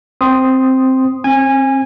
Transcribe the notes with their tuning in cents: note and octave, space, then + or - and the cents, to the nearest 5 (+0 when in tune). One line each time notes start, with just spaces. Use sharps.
C4 +0 C6 +0 D#6 +0
C4 +30 G#5 -20